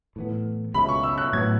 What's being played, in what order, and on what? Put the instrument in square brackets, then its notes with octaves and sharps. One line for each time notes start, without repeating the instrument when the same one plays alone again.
[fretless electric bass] A2 E3 B3
[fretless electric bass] C#2 B2 G#3 C#4 [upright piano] B5
[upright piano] C#6
E6
F#6
[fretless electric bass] A2 F#3 B3 [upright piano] G#6